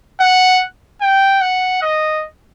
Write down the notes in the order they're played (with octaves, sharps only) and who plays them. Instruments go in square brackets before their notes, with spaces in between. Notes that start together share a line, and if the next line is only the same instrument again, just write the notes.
[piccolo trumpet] F#5
G5
F#5
D#5